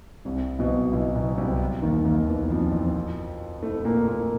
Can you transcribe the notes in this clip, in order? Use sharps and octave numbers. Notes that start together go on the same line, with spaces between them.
C2 C3
B1 B2
B1 B2
B1 B2
C2 C3
D#2 D#3
D#2 D#3
E2 E3
F2 F3
F2 F3
A2 A3
A#2 A#3
A#2 A#3